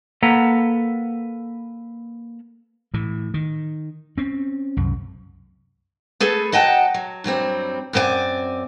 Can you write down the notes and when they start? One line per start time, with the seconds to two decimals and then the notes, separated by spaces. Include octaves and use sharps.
0.23 A#3 A4 B4 F#5 A#5
2.94 A2 E3
3.34 D#3
4.18 C4 C#4
4.77 C2 F#2
6.20 A3 G#4 A4 B4
6.52 F#3 D#5 F#5 G5 A5
6.94 F#3
7.24 G2 F#3 G3 C4
7.93 F#2 B3 C4 A#4 D5 G#5